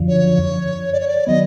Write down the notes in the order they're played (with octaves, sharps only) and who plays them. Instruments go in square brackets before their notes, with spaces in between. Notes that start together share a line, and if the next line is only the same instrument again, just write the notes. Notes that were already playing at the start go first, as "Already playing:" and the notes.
Already playing: [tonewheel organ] F#2 D3 F3
[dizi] C#5
D5
C#5
D5
[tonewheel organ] D#3 F#3 B3 [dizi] D#5